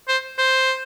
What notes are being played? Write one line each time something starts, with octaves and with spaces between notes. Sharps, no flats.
C5
C5